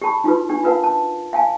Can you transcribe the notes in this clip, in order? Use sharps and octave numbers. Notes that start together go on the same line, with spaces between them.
G4 A4 A5 B5 C#6
D#4 F4 F#4 A4 B4
D4 G4
F4 A#4 B4 F5 F#5 A5
A5
F5 G#5 A5